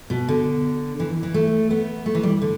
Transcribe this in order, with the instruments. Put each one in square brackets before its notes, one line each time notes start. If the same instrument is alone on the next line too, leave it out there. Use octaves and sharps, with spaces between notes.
[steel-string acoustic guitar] B2
D3
E3
E3
A3
B3
A3
E3
G3
D3